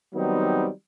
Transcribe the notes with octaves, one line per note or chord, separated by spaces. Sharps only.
D#3 F#3 G3 B3 C4 D#4